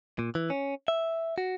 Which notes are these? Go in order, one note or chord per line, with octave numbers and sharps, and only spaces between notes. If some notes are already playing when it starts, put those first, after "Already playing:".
A#2
E3
C#4
E5
F#4